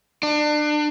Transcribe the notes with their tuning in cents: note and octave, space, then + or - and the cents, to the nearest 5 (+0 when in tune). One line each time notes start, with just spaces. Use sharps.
D4 +30